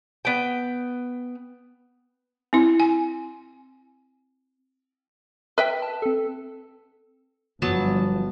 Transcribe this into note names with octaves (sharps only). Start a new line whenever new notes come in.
B3 G5
C4 E4
G#5
B4 E5 G5
A5
C4 A4
G1 F3 F#3 B3 A5